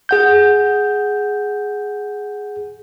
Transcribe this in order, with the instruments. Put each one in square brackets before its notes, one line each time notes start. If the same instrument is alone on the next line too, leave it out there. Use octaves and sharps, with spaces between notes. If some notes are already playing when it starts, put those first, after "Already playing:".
[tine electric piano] G#4 F#5 G6